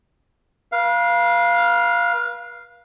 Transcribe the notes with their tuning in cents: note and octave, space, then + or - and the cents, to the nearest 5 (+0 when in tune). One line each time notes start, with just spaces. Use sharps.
B4 -40 F5 -5